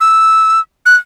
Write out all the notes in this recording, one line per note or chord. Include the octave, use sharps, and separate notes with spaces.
E6
F#6